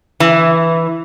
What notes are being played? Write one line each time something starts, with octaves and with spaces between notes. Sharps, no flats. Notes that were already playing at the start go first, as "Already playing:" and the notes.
E3